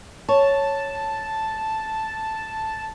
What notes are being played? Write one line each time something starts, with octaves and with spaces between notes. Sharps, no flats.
C#5 A5